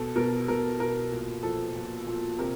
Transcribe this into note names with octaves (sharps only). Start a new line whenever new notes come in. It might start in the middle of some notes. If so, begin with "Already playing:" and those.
Already playing: B2 A4
B2 A#4
B2 A#4
B2 A#4
A#2
F3 A4
A#2
A#2
C3 A#4